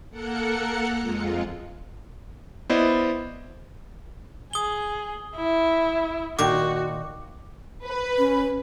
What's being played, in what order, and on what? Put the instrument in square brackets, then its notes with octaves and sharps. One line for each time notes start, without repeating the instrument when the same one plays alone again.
[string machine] A#3 A4 A#4 F#5 F#6 C#7
F2 G#3 F4
[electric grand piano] B3 E4 C5 D5 D#5
[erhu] G#4 [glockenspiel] D#6 G7
[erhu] E4
[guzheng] A#2 D#3 [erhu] F#4 [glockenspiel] D6
[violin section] B4
[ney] C#4